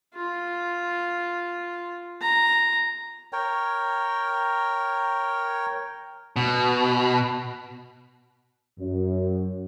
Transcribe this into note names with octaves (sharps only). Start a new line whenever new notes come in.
F4
A#5
A#4 C#5 G5
B2
F#2